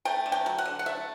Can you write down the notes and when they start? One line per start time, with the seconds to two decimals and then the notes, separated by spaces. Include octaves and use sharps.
0.05 A3 G5
0.26 D3
0.32 G5
0.46 F#3
0.58 F#5
0.65 D3
0.79 F#5
0.86 A3 E5